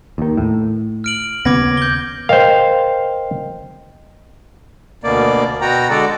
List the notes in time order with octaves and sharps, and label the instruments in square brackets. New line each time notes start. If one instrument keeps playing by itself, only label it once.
[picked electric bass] D#2 D#3
A2
[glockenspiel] F6 D7 F#7
[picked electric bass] D#2 C#3 B3 [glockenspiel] D6 G#6 A#6
[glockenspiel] G6 G7
[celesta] A#4 D#5 G5 [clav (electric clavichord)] C5 F5
[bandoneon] D2 B2 A#3 D5
B2 F#4 G5 A#5
D3 G#3 F#4 A4 D5